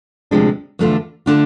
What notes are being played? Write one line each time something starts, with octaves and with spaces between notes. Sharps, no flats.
D2 C3 F3 G#3 D4
E2 D3 A3 D4 F4
D3 A3 D4 F4